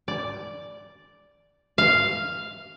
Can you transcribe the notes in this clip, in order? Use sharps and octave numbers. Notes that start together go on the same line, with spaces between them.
D5
F5